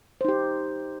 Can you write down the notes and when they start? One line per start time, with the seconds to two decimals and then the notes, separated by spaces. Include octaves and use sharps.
0.21 C5
0.25 D#4
0.28 G4